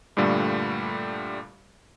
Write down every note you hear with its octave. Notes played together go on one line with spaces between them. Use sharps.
G2 A#2 D3 G3 A3